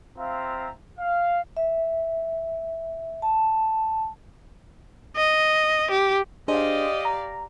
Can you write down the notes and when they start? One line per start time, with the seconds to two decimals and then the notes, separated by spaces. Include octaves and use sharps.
0.17 C4 F4 E5 F5 A#5
0.99 F5
1.57 E5
3.22 A5
5.16 D#5
5.91 G4
6.48 D4 G4 G#4 C5 D5 D#5 F5
7.05 A#5